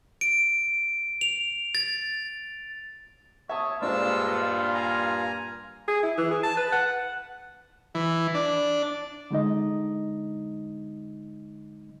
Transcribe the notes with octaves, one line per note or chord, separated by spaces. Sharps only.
D7
F7
A6
C#5 E5 A5 D#6
G2 A#2 G#3 D4 F4 C5 A5 E6
G#5 A#5
G#4
E4
E3
G#4
A5
B4
F#5
E3
D4
D3 G#3 D#4 D#5